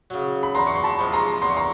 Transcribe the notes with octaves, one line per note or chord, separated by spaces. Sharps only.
C#3 F#3
B5
E2 A#5 C6
C#6
C6
A5 B5
C3 F3 G#3
A#5 C6
E2 C6
C#6
A#5 C6